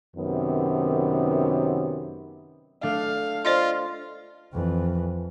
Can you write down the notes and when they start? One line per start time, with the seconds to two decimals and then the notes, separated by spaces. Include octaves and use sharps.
0.17 F#2 C3 D#3 B3
2.83 A3 D4 F5
3.45 F4 C5 D5 D#5
4.53 F2 E3